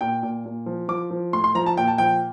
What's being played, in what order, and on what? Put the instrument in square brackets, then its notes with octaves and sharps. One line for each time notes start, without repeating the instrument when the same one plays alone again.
[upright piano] A#2 G5
A#2
A#2
F3
F3 D6
F3
A2 C6
C6
F3 A#5
A5
A#2 G5
A5
F3 G5